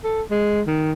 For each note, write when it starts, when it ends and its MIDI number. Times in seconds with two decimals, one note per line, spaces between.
0.04 0.22 69
0.31 0.61 56
0.67 0.93 51